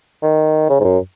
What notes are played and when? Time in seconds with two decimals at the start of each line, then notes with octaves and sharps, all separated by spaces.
0.23 D#3
0.69 C#3
0.80 G#2
0.84 F#2